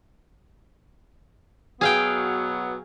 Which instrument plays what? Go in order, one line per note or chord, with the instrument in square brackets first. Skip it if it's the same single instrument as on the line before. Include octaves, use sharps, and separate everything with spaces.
[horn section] B2 F#3 B3 [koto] G#4 F5 G5